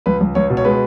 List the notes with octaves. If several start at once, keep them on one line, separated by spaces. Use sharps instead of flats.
C#2 B4
C#2
C#2 C#5
B2
C#5
G#3 B4